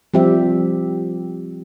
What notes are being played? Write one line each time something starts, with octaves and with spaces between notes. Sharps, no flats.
F3 G3 C4 G4 E5